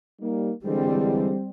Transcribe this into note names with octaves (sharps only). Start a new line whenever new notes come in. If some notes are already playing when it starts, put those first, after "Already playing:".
G3 A#3 D#4
D3 E3 G3 G#3 C4